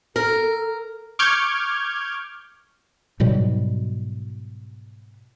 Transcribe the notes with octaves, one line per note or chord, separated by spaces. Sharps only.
A4 A#4
C#6 D6 F6 G6 G#6
G#2 B2 F#3 G3